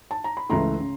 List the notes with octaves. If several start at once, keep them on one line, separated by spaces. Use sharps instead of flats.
A5
A#5
B5
C#2 C#3 E3 A3 A#5 C6
C#3